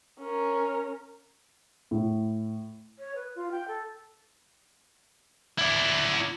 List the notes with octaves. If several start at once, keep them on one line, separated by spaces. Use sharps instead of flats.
C#4 A#4
A2
C#5
B4
F4
G5
A4
E4 D5